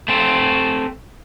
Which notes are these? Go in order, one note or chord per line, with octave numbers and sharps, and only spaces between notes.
A3 C4